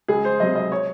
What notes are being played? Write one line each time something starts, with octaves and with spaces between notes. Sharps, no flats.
C#2 G#4
C5
C3 F#3 D#5
D#5
C#5